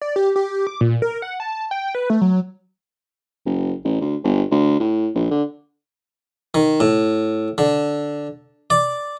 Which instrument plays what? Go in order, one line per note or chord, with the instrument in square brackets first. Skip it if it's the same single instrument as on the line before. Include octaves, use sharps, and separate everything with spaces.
[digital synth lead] D5
G4
G4
D6
A#2
A#4
F#5
A5
G5
B4
A3
F#3
[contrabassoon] F#1
A1
D2
G1
D2
A2
A#1
D3
[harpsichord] D#3
A2
D3
D5